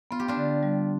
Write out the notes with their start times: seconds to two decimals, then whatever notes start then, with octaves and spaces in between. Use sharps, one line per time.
0.11 B3 F4
0.20 G4
0.28 D4 F4
0.37 D3
0.63 G3